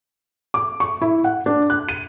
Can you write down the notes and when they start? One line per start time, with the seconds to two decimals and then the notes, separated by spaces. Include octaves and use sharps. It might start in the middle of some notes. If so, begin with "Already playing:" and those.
0.54 D6
0.80 C#6
1.02 E4
1.24 F#5
1.46 D4
1.70 F#6
1.89 D#7